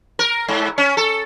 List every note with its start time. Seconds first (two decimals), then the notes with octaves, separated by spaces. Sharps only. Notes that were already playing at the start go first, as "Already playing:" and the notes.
0.19 A#4
0.48 G#2
0.78 C#4
0.97 A4